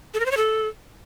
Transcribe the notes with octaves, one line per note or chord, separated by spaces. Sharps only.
A4
A#4
C5
C#5
A4